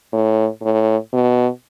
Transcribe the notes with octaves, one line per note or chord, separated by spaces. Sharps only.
A2
A2
B2